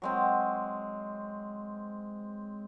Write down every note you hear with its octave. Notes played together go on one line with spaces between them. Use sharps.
F#3 G#3 C4